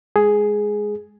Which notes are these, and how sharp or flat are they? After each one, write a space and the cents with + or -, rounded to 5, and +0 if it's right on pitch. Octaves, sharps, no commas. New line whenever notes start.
G#3 +0 G#4 +5